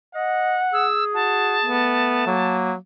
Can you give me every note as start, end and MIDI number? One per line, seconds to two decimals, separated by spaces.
0.15 0.60 75
0.15 0.87 78
0.73 1.81 68
0.73 1.04 88
1.14 1.56 66
1.14 2.56 81
1.65 2.36 57
1.65 2.23 59
2.26 2.75 54
2.26 2.72 58